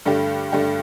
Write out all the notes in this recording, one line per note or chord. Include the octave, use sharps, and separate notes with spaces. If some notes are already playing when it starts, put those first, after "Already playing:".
G2 D3 A3 D4 G4
G2 D3 A3 D4 G4